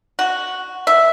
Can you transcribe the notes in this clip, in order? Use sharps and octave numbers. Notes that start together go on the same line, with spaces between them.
F#4
E5